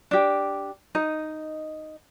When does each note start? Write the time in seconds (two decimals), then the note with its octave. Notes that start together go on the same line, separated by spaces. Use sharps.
0.11 D4 G4
0.95 D#4 D#5